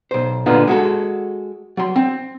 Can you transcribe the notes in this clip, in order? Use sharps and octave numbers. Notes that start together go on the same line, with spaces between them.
B1 C5
A#2 D3 B3 D#4 F4
G#3 F#4 A4
F#3 C6
C4